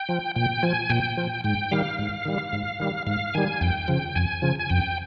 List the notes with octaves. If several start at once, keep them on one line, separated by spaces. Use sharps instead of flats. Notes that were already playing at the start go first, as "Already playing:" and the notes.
Already playing: G5
F3
A#2 G5
F3 G#5
A#2 G5
F3
G#2 G5
D#3 G3 F5
G#2
D#3 G3
G#2
D#3 G3
G#2 F5
D#3 G3 G#5
F2 G5
C#3 F3
F2 G#5
C#3 F3
G#5
F2 G5